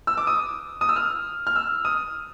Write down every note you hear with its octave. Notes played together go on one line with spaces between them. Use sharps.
E6
D6
D#6
D#6
E6
F6
F6
E6
D#6